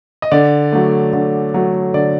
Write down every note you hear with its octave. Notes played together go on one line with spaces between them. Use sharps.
D#5
D3 D5
F#3 A3
D3
F#3 A3
D3 D5